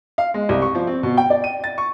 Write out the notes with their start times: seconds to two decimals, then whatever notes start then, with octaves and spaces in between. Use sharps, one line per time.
0.18 F5
0.34 G#3
0.49 C2
0.62 C#6
0.75 F3
0.87 C4
1.03 B2
1.17 G5
1.30 D5
1.44 D#7
1.64 A6
1.78 C#6